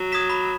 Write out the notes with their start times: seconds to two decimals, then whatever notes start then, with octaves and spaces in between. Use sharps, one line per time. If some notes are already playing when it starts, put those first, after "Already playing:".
Already playing: F#3
0.12 D#6 G#6 B6 E7
0.30 B5